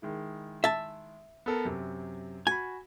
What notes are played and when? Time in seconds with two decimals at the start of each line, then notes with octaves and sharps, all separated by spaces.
0.02 D#3 G#3 E4
0.64 E5 A5
1.46 B3 A4 A#4
1.65 F#2 C3
2.47 F#4 G#5 B5